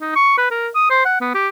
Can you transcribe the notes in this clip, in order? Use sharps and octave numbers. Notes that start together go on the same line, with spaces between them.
D#4
C#6
B4
A#4
D#6
C5
F#5
B3
G4